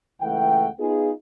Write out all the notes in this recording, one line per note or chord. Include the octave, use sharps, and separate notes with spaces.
C#2 E3 A3 F#5 G5
B3 D#4 F4 G#4